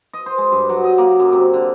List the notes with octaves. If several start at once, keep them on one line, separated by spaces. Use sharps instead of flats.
D#5
C5
G#3
G2
F#3
D#5
A#3
F#2
C3
D3